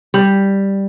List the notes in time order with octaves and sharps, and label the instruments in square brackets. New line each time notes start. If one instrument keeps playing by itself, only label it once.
[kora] G3